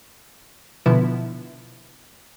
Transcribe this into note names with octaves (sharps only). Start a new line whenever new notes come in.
B2 D3 F3 B3 E4